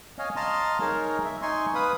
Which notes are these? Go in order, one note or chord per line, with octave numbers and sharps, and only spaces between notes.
C#5 D#5 F5 G#5
D#5 F5 A5 A#5 C6 F6
D#4 G#4 A#4 C#5
E5
D#4 G#5 C6 C#6
B4 F5 B5 D#6